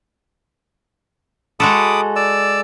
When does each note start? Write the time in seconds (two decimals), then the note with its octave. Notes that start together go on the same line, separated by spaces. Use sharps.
1.60 G#3 F#4 A4 B5 D6 D#6
2.16 D5 E6